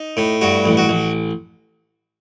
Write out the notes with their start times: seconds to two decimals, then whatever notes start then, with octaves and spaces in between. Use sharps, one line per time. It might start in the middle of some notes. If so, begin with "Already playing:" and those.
Already playing: D#4
0.17 A2
0.41 G2 F#4
0.65 A1
0.77 F#4
0.89 A1